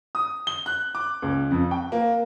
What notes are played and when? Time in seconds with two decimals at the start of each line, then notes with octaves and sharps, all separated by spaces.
0.15 D#6
0.47 G7
0.66 F#6
0.95 D6
1.22 C#2
1.51 F2
1.71 G5
1.92 A#3